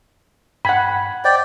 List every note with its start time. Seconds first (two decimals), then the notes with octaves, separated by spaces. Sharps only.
0.65 G2 F#5 G5 B5 G#6
1.25 C5 D5 D#5 G5